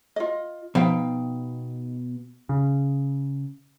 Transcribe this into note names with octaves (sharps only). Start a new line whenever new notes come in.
F4 D#5
B2 F3 D#4 F5 G5
C#3